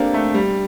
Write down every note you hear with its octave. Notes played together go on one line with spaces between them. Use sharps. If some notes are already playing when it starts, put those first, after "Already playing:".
Already playing: A#3 C4 D4 G4 A4
A3
G3